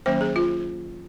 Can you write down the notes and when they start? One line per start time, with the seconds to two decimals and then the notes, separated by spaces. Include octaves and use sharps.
0.06 D#3 F#3 A#3 C#4 C5
0.21 G#4
0.36 F4